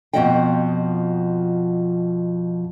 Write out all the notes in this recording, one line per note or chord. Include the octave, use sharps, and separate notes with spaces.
F2 B2 F3 D#5 F#5 G5